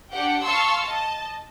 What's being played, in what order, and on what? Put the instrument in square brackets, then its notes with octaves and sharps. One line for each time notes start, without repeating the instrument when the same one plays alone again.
[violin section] D4 G4 F#5 G5
F5 A5 C6 C#6 E6
D#5 A5